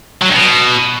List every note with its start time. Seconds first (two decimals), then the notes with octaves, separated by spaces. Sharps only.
0.22 F#3
0.28 G2
0.35 B2